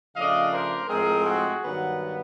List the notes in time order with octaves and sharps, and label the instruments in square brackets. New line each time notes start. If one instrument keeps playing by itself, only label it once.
[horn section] C#3 F3 A3 D4 D#5 F5
A#4 C5
A2 F3 G#3 C4 G#4 A#4
F#4 G#4
G2 D#3 F#3 B3